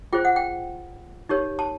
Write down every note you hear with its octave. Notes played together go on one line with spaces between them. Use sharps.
F4 G#4 C5 G5
F#5
G5
D#4 G4 A#4 C#5
A5